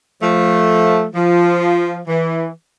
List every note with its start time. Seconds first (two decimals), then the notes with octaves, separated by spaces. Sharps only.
0.22 F3 A3
1.15 F3
2.08 E3